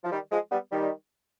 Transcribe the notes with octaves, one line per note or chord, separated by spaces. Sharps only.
F3
D#3 G3
F3 G#3
G3 B3
D#3 G3